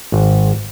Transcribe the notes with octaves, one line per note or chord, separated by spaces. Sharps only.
G#1